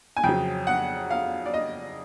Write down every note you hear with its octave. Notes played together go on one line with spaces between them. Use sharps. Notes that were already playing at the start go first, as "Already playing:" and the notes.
G#5
F2 C#3 F#3 G5
F#5
F5
D5
D#5